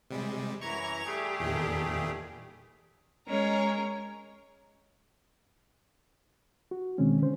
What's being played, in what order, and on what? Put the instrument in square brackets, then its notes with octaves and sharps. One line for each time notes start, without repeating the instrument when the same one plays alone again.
[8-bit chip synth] C3 G3 G#3
[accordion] F#2 E3 A#5 [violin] E4 F7 [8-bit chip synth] C#6 G#6
[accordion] G3 A3 G#4 [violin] G4
[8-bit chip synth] E2 A#2 D#3
[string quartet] G#3 C#4 A#4 C#5
[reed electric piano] F#4
B2 D#3 G#3 C4 C#4
D3 C#4 C5